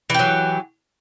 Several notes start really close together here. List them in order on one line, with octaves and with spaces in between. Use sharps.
E3 G4 F#3